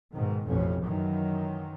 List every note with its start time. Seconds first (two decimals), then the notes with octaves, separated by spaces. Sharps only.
0.14 G#2 B2 D#3
0.47 A1 F2 B2 C#4
0.83 F#2 D#3 E3 F#3